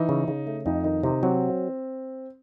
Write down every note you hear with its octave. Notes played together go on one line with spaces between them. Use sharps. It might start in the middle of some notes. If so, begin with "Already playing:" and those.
Already playing: E3 D#4
C#3
C#3
A3
F2 D#4
D#3 D#4
C3 D#4
F#3 C4